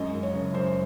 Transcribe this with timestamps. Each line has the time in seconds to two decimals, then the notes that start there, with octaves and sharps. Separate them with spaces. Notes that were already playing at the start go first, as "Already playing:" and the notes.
Already playing: F#2 G#3 D#5
0.14 F#2
0.23 C#5
0.33 F#1
0.54 F#2 C5